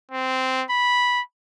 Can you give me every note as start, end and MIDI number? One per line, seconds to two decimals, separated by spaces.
0.11 0.64 60
0.70 1.21 83